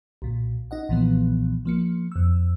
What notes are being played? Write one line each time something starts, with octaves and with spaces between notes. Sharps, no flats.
B1 A#2
D#4 D#5 F#5
B1 A#2 E3 F3 B3
F3 A#3 C#7
F2 E6